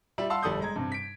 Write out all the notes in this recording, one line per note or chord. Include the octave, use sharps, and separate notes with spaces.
G3 F4 E5
F5 F#5 A5 C6 E6
G1 G3 A4 D#6 G6
G#3 A#5 G#6
G2 C3
B6 D7